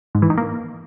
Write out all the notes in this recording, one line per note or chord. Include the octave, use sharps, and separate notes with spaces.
G#2
E3
D#3
A#3